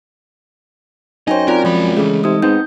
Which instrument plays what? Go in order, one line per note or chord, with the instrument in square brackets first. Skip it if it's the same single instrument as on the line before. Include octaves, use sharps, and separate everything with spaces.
[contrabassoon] F#2 [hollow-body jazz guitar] D#4 C5 [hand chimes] C#5 G5 G#5 [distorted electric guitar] D#5
[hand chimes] C4 F4 D5 [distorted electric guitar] A#4 A#5
[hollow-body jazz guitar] F3 [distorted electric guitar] G#3 B5
[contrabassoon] C#3 [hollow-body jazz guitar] E3 A3
[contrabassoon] C3 [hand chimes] D#4 D#6
[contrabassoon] G#2 [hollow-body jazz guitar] B3 C4 D#4 [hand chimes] G6